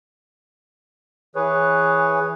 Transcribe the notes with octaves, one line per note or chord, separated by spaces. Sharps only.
E3 G#4 B4 C#5